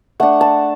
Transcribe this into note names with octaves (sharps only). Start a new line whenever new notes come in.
A3 D4 F#5
A5